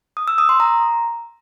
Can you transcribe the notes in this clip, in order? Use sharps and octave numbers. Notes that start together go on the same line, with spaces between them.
D#6
E6
D#6
C6
A#5